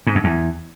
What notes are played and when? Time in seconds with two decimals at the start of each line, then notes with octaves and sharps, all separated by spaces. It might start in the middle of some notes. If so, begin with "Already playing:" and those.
0.07 G#2
0.15 F#2
0.24 E2